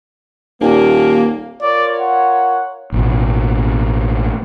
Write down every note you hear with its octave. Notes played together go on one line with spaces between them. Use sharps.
D#1 A#3
F4 A#4 C#5 D5
F#5
A1 B2